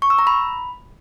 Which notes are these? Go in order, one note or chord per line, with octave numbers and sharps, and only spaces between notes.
C#6
E6
A#5
B5